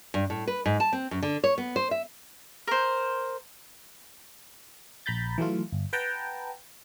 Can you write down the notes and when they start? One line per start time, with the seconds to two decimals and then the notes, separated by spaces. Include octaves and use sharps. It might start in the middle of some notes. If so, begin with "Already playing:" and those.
0.14 G2
0.30 A2
0.47 B4
0.66 G#2
0.80 A5
0.93 C4
1.11 F#2
1.23 D3
1.44 C#5
1.58 B3
1.76 C5
1.91 E5
2.68 A#4 C5
5.06 A#1 A#5 B5 G6 A6
5.38 E3 F#3 A3 F4
5.72 G1
5.93 B4 F#5 G5 A5 A#5